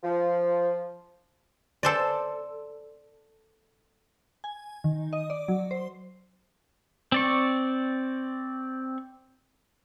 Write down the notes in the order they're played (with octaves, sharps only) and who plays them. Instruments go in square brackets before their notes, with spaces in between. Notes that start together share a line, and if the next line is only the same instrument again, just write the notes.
[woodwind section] F3
[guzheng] A4 C5 D5
[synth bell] G#5
D#3
D#5
D5
F#3
C5
[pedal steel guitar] C4 D5 C#6